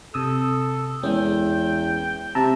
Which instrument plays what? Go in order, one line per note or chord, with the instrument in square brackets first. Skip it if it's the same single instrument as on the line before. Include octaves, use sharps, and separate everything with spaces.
[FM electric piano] C3 D#6 E6 [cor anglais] A4
[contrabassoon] E2 [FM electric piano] G#3 C#4 [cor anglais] G5
[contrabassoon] C3 [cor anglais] E5 [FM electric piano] A5 A#5 E6